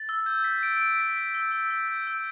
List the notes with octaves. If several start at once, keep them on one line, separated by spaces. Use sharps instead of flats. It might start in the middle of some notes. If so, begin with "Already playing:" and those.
Already playing: A6
E6
G6
B6
D7
D7
B6
B6
E6
E6
E6
G6
E6